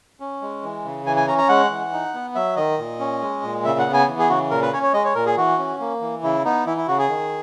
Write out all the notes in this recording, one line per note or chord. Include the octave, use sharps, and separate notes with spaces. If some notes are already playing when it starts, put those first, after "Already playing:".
C#4
G#3
E3
C#3
E3 G#5
G#5
C#4 A#5
A#5
G#3 F#5
E3
D#4
B3
F#3 E5
D#3 D#5
A#2
C#4
G#3
A#2
C#3 E5
F#5
B3
G#5
E3
G#4
C#3 F#4
A#2 A#4
B4
C#4 C#5
C#5
G#3 D#5
C#5
A#2 A#4
G#4
E3 F#4
C#4
A#3
E3
C#3 E4
B3 D#4
E3 E4
E4
C#3 F#4
G#4
D#3